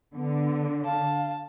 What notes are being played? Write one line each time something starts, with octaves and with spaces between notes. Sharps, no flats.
D3 B3
F5 A5